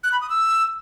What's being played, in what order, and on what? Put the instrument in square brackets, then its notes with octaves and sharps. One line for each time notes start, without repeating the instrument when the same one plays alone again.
[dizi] F#6
B5
D#6
E6